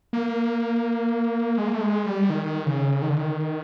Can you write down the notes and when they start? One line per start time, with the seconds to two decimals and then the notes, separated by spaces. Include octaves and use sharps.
0.13 A#3
1.58 G#3
1.68 A#3
1.74 A3
1.81 G#3
2.06 G3
2.30 D#3
2.66 C#3
3.02 D#3
3.10 D3
3.17 D#3